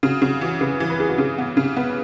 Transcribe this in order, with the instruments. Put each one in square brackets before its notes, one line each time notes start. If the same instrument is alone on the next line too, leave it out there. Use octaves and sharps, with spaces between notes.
[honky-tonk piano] C#3 [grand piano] F#4
[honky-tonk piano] C#3 [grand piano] F#4
[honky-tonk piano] E3 [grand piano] F#4
[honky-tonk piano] C#3 [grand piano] B4
[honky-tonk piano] E3
[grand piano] B4
[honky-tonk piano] E3 [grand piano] G#4
[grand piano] F#4
[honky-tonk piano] C#3 [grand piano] G#4
[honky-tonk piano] B3
C#3
[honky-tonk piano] B3 [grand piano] B4